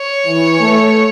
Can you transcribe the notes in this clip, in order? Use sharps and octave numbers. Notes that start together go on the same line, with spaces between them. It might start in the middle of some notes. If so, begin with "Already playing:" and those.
Already playing: C#5
E3
A3